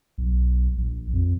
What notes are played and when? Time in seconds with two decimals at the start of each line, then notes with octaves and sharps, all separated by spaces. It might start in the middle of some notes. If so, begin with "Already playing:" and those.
0.18 B1
0.78 A#1
1.13 F2